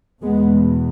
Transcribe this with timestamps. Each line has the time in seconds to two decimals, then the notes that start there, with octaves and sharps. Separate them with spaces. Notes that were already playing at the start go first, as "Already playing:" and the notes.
0.22 E2 B2 G#3 B3